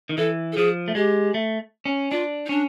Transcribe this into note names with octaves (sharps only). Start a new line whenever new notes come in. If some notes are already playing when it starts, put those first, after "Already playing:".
D#3
E3 A4
A4
F3 G#4
A3
G#3 G4
A3
C#4
D4 F4
D#4
C#4 D4